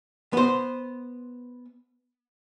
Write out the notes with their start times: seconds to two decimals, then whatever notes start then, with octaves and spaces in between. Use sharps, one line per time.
0.33 B3 C5